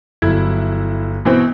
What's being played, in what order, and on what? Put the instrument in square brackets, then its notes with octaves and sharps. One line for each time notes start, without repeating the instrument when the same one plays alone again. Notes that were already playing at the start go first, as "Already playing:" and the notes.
[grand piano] G1 F#3 G#6 [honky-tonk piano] E4
[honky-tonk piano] B2 E3 C4